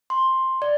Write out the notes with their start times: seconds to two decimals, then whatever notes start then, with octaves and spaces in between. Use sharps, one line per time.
0.10 C6
0.62 D5